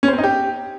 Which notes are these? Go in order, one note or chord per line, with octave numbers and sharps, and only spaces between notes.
C#4
C5
C4
D#4
G4